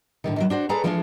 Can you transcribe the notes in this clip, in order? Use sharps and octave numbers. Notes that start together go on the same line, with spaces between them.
A2 D3 D#3
D#3 E3 F#3
D4 F#4 C5
G#4 A4 B4 C#5 D5 A#5
E3 F3 G#3 A3 D4 F4